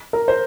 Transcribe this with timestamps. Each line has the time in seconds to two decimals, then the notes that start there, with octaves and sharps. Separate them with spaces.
0.13 A#4
0.28 C5